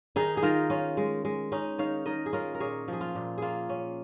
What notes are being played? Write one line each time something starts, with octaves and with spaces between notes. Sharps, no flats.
D#3 D#4 G#4
G#4
D#3 F4 A#4
C#4 F4
G#3
G#3
C#4 D#4
D#3 C#5 F5
D#3 A#4 D#5
G#4
C#4 F4 A#4
A#4
A#2 G#4 C#5
F3 G#4
F4
A#2
A#3 F4 G#4
C#4